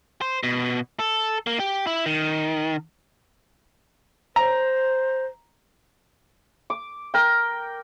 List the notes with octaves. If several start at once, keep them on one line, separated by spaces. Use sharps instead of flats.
C5
B2
A4
A#3
G4
E4
D#3
C5 A#5
D6
A#4 G5